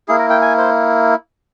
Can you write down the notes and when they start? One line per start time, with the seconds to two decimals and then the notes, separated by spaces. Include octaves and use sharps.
0.08 A#3 E4 G#4
0.19 A#4
0.30 G5
0.42 G#5
0.58 C5